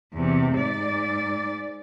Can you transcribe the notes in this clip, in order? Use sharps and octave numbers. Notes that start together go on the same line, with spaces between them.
E2 C3
G#2 D5